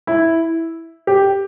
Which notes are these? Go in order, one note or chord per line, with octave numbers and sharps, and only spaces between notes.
E4
G4